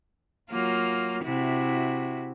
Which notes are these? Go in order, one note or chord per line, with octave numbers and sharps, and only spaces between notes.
F#3 A#3 F4
C3 E4 F#4